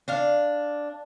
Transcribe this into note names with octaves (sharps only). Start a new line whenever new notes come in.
D4 F5